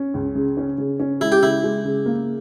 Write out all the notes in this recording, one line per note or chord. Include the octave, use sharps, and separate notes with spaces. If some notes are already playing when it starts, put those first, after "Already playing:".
Already playing: C#4
C#2
C#3
C#4
C#3
C#4
G#3 E4
G4
C#3 E4
G#3
C#3
A#3